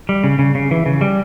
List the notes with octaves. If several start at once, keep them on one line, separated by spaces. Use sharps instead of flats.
G3
C#3
C#3
C#3
E3
C#3
G3